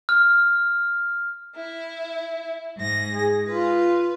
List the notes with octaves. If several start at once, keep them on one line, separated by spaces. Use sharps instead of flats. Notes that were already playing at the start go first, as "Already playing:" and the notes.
F6
E4
G#2 A#6
G#4
F4 B4